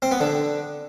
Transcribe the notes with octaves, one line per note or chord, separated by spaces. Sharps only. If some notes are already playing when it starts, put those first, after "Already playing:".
C4
B3
D3